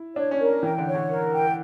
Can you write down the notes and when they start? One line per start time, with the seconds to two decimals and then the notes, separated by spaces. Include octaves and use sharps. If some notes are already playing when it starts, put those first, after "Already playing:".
Already playing: E4
0.15 D4 C#5
0.31 C#4
0.39 A#4
0.63 E3 G5
0.78 D3
0.87 C#5
0.94 D3
1.10 A#4
1.33 G5